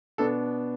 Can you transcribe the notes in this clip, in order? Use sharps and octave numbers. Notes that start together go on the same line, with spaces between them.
B2 B3 D4 A4